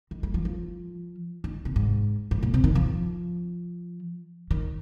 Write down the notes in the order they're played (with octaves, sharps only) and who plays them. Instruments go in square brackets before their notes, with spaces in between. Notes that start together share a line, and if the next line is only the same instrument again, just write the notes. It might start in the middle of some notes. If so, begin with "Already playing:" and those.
[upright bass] D#3
G#3
F3
F3
D#3
C3
G#2
G#2
A#2
C3
D#3
F3
D#3